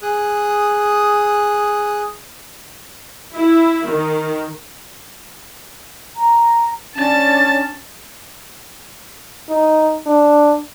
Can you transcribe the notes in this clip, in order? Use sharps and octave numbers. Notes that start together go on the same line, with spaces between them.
G#4 D#6 F#6
E4
D#3
A#5
C#4 D4 A5 A6
D#4
D4